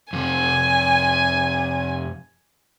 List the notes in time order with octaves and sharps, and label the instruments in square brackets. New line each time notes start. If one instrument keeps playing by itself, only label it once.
[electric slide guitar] F2 C3 [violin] G#5